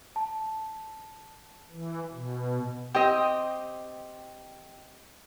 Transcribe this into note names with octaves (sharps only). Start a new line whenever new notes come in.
A5
E3
B2
C4 G4 D#5